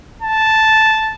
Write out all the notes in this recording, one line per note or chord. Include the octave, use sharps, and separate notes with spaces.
A5